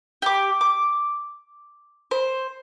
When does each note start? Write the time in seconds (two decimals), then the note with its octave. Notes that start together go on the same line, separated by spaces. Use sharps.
0.22 G4 D6
0.61 D6
2.11 C5